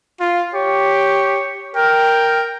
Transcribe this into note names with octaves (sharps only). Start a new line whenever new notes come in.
F4
G4 C#5
A#4 G5